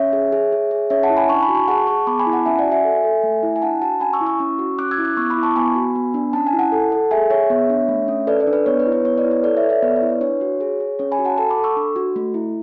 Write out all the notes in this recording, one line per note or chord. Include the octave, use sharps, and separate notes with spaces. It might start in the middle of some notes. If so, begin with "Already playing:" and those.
Already playing: C#4 C#5 E5
G#4
G#4
G#4
G#4
C#4 C#5 E5
F#5 A5
E4
G#5 B5
D4 A5 C#6
G#5 B5
F#4
A5 C#6
G#4 F#5 A5
G#4 A5 C#6
B3 B5 D6
G#5 B5
E4
F#5 A5
C#4 E5 G#5
D5 F#5
F#4
E5 G#5
A4
A4
A3
E4
G#5
D4 F#5 A5
F#4 F#5 A5
C#4 G#5 B5
C#6 E6
E4
C#6 E6
C#4
F#4
C#4 D6 F#6
E6 G#6
E4
D6 F#6
B3 C#6 E6
B5 D6
E4
A5 C#6
B3 G#5 B5
F#4
B3
D4
C#4 A5
G#5
E4
F#5 A5
A4
A4
G#4 E5 G#5
G#4 C#5 E5
B3
D4
A3
C#4
A4 B4 D5
B4 D5
D4
B4 D5
B3 C#5
B4
E4
B4
B3 C#5
B4 D5
E4
C#5
A4 B4 D5
C#5 E5
A4
C#5 E5
B3 B4 D5
C#5
E4
B4
D4 C#5
F#4
G#4
G#4
C#4 C#5
G#5 B5
F#4
F#5 A5
A4 F#5 A5
B5 D6
A4
C#6 E6
D4
F#4
A3
E4